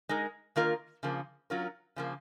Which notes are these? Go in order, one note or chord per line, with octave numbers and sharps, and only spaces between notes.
G#3 D#4 A#4
D#3 A#3 F4 A#4
C#3 F3 A#3
F#3 C#4 F4 A#4
C#3 F3 A#3